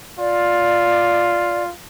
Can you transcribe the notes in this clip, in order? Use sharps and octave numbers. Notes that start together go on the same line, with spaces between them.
F4 D5